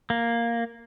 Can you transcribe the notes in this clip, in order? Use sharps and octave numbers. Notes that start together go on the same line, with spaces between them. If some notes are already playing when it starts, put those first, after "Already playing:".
A#3